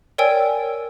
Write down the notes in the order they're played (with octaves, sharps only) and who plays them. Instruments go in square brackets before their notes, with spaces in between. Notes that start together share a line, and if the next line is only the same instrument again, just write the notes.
[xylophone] A#4 C#5 D5 G5 G#5 E6